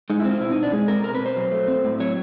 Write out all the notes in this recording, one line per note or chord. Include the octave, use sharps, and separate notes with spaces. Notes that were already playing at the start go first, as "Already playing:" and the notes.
G#3 D#4
E4
C4
F4
B2 E4
D#4
B2
D4
G#3 G#4
C4 A#4
B2 A#4
B4
B2
C5
F#3
A3
C4
A2
F#3 C#5